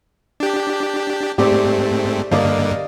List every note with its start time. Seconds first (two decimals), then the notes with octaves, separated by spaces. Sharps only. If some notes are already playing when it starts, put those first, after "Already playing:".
0.40 D4 G4
1.38 G#2 A3 C4 G4 D5 D6
2.31 G2 D3 A#3 D5 D#5 F5